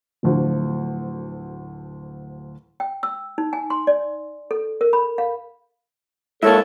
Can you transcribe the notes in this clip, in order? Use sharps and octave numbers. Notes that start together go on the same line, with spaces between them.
D1 D2 F3
G5
E6
D#4
G#5
C6
D5
A4
A#4
B5
F5
G#2 A#3 A4 C#5 E5 A5